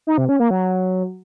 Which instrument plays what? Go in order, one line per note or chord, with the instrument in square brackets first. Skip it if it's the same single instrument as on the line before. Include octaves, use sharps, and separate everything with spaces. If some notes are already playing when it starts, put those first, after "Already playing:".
[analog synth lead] D#4
C3
C#4
A#3
F#3